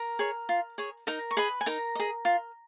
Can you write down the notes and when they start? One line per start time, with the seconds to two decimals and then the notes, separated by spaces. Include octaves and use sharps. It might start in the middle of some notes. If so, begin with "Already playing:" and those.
Already playing: A#4 A#5
0.19 G#4 C#5
0.49 F4
0.78 G#4 C#5
1.07 D#4 A#4 A#5
1.31 C#6
1.37 G#4 B4 D#5 B5
1.61 G#5
1.66 D#4 A#4 A#5
1.95 G#4 D#5
2.25 F4